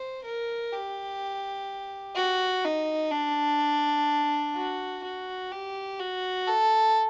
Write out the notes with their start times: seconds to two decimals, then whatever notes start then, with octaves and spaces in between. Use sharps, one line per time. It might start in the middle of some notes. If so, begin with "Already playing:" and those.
Already playing: C5
0.24 A#4
0.73 G4
2.16 F#4
2.65 D#4
3.12 D4
4.56 F#4
5.04 F#4
5.52 G4
5.99 F#4
6.47 A4